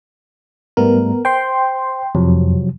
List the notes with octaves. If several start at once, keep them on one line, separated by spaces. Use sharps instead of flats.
G#2 G3 A3 B3 A#4
C5 G5 C6
F2 C3 F3 F#3